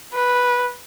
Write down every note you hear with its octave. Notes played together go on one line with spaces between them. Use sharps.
B4